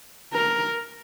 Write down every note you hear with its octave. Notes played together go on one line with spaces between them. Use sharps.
A#4